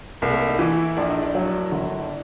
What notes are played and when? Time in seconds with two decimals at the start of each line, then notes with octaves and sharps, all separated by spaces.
0.22 C2 A#3
0.30 A3
0.38 A#3
0.47 D#4
0.59 E3
0.72 E4
0.97 A#1 D4
1.10 D#4
1.23 D4
1.35 F#3
1.72 G1